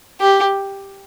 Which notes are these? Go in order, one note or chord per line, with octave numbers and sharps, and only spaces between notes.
G4